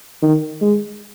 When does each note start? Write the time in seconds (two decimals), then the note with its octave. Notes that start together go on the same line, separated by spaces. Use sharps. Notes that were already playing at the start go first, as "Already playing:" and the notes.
0.22 D#3
0.61 G#3